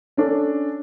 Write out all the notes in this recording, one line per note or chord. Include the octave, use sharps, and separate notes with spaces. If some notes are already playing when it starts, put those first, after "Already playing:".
C#4 D4 A4 D5